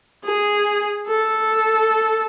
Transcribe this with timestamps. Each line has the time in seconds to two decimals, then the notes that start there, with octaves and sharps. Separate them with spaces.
0.24 G#4
1.08 A4